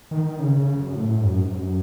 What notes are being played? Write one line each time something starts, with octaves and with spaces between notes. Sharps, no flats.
D#3
D#3
C#3
C#3
F#2
A2
G#2
F#2
G#2
F#2